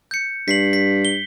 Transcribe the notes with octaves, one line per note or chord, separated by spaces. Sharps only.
G6 C#7
G2 B6 C7 F#7
B6
G7